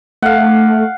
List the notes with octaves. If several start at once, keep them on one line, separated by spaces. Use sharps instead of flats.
A3 F5 F#5